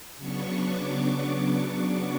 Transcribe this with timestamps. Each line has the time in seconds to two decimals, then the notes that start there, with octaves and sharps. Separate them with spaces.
0.18 C#3 F#3 B3 D4 C#6
0.63 D6